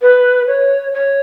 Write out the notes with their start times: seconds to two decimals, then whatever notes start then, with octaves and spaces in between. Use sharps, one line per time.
0.01 B4
0.47 C#5
0.93 C#5